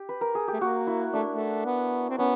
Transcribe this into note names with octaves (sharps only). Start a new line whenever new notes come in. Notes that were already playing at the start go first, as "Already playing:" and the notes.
Already playing: G4
B4
A#4
G#4
G4
A3
A#3 F#4
E4
A3 D4
A3
B3
C4
B3 C#4